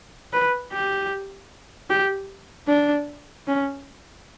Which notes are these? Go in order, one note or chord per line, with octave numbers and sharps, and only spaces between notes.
B4
G4
G4
D4
C#4